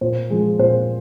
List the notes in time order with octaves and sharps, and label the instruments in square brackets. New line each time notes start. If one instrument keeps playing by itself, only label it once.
[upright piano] A#2 C5
F3 G#3
A#2 C5